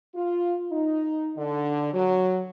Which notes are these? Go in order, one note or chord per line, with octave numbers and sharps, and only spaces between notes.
F4
D#4
D3
F#3